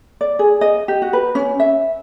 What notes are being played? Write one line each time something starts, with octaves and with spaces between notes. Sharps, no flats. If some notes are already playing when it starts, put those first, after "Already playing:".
D5
G#4
D#5
G4
F#4
B4
C#4
E5